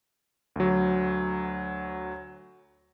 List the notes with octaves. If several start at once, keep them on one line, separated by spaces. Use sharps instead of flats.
D2 F#3